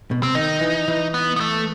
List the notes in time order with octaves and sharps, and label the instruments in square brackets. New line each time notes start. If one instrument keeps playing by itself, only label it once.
[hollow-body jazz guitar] B2
[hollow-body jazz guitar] C3 [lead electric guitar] C4
[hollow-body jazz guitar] D#3 [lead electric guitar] D#4
[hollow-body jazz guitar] E3
E3
[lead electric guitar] B3
B3
A3